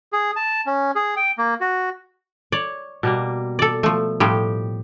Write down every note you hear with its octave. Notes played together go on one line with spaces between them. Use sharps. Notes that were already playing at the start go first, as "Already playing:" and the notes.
G#4
A5
C#4
G#4
G5
A#3
F#4
C#5 D5
B2 G3 A#3
A4 D5
F3 A3
A2 F3 G3 G4